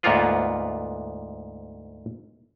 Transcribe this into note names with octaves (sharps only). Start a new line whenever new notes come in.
D2 G#2 A#3 B3 F4 B4